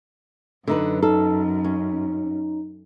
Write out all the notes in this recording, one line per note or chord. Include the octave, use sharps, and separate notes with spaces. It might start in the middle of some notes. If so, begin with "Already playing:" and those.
F#2 D3 D#4 B4
D#4 A4
C#4